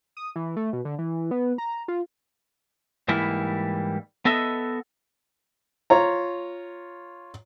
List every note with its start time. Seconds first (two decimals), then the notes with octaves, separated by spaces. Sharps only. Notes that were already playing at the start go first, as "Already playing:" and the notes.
0.17 D#6
0.36 E3
0.56 A3
0.73 B2
0.85 D3
0.99 E3
1.31 B3
1.58 A#5
1.88 F4
3.08 G#2 E3 G3 A#3 E4
4.25 B3 A4 D#5 E5
5.90 F4 C#5 A#5